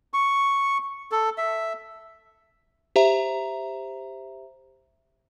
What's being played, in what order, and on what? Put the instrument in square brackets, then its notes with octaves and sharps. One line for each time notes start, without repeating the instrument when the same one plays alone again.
[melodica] C#6
A4
E5
[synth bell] G4 C5 E5 A#5